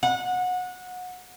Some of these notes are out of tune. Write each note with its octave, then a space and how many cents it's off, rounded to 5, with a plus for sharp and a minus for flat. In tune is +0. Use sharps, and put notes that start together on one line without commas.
F#5 -25